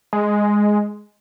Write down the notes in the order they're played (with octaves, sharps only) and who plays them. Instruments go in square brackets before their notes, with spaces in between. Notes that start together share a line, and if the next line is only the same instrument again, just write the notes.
[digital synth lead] G#3